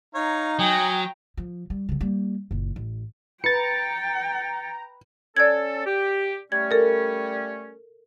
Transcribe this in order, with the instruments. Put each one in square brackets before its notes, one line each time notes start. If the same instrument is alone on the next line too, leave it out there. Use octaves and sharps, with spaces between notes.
[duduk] D#4 [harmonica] C#5 F5 A#5
[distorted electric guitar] F#3 [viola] G5 A#5 [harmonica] G#5 D#6
[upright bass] F3
G3
C#3 F#3
G3 A#3
F#1 A#2
A1
[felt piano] B4 [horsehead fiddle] G5 [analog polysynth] A#5 [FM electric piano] A6 C#7
[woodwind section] C#4 A4 [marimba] D5 G#6
[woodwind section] G4
[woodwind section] G3 A3 C#4 [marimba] G#6
[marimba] A4 A#4